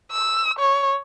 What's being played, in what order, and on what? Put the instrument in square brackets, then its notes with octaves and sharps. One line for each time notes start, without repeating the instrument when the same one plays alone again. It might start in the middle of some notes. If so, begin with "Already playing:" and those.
[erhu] E6
C#5